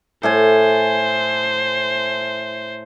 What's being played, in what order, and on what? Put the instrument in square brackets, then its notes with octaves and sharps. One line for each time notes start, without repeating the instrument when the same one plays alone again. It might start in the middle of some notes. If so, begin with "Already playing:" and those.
[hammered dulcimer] A2 F#5 G#5 [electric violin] C5